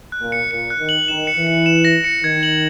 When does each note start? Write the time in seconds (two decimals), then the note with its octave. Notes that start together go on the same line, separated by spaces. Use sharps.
0.12 F#6
0.22 A#2
0.32 C#7
0.50 A#2 C#7
0.70 F#6
0.79 D#3
0.89 F#7
1.08 D#3 E7
1.27 C#7
1.37 E3
1.47 C#7
1.66 E7
1.85 A#6
2.04 C#7
2.23 D#3 G#6
2.43 F#7